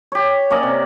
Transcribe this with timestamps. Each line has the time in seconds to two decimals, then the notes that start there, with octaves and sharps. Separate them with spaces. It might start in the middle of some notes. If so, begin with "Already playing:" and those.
0.12 G4 C#5
0.50 A#3 C#4 D5 D#5
0.63 C3